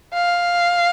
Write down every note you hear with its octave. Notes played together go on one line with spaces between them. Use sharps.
F5